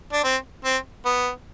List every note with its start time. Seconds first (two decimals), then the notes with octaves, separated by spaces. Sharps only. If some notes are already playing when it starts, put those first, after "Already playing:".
0.13 D4
0.24 C4
0.64 C4
1.05 B3